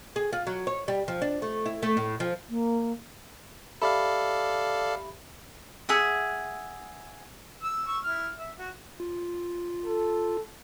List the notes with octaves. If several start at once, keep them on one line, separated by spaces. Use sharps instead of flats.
G#4
F4
F#3
C#5
G3
F3
D4
A3
E4
A3
A2
F3
A#3
G4 A4 D5 E5 F5 B5
G#4 E5 F#5
E6
C#6 E6
E4 F6
E5
F#4
F4
A4